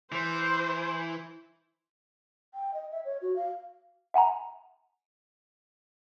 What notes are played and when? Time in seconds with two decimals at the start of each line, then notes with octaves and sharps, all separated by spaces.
0.12 E3 C5
2.54 G5
2.74 D#5
2.92 E5
3.05 C#5
3.22 F#4
3.36 F5
4.14 E5 F#5 G#5 A#5